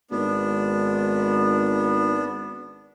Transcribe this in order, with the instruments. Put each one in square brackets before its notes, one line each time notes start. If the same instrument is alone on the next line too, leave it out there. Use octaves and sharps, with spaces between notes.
[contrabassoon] G#1 [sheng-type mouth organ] B3 D4